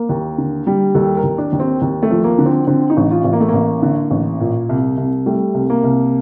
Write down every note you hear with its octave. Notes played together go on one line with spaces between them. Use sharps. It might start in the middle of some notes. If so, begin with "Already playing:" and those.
Already playing: A#3
D#2
D3
G3
D#2 A4
A#4
D#2
D4
D#2
C4
D#2
A3
F3
A#3
D3
C4
D3 C4
D#4
A1
F4
A1
A#3
A3
A1 A#3
D3
A1
A#2
C2
C2
G3 A3
C2
A#3
C2